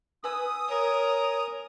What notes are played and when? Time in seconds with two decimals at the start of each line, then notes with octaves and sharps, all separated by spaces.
0.24 B4 G#5 D#6 E6
0.69 A#4 C#5